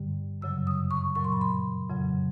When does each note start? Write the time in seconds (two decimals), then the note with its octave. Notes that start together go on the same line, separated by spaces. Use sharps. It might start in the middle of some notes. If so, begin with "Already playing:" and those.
Already playing: G2 D3 G3
0.41 F#2 C#3 F#3 E6
0.67 D#6
0.91 C#6
1.15 A#2 F#3 C#6
1.24 C6
1.32 B5
1.41 C6
1.90 F2 C#3 F#3